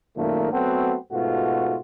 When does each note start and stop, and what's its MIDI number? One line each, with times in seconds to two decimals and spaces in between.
0.17 0.52 32
0.17 0.52 42
0.17 0.52 46
0.17 0.52 51
0.17 0.52 57
0.17 0.52 58
0.52 0.95 54
0.52 0.95 57
0.52 0.95 59
0.52 0.95 60
0.52 0.95 66
0.52 0.95 69
1.12 1.78 44
1.12 1.78 47
1.12 1.78 57
1.12 1.78 65
1.12 1.78 66